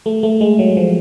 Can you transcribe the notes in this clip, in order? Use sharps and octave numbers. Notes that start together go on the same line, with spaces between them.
A3
A3
G#3
F#3
F3